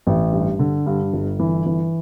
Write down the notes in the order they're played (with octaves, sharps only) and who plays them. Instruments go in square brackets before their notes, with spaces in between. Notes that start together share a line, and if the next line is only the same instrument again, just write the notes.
[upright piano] A1
G2
D3
G2
G1
E3
E3